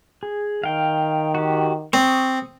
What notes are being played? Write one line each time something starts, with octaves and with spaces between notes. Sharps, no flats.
G#4
D#3 F5 G5
F#4 G4
C4 C#6 D#6